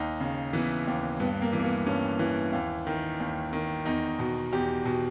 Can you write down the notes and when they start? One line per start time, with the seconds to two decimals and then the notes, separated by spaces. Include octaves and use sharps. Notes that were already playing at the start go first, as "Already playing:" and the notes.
Already playing: D#2 D#4
0.20 C#3
0.53 E3 B3
0.87 D#2
1.20 G2 B3
1.42 A#3
1.53 E3
1.60 A#3
1.64 B3
1.87 G2 C#4
2.19 E3
2.53 D#2
2.87 D#3
3.20 D#2
3.53 D#3
3.85 E2 D#4
4.19 B2
4.52 E2 G4
4.85 B2